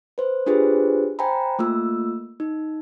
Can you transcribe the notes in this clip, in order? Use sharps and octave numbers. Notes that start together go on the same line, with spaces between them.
B4 C5
D4 F4 G4 G#4 B4 C5
C5 G5 G#5 A#5 B5
A3 A#3 F4 E6
D#4